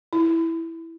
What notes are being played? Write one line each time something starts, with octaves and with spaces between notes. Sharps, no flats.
E4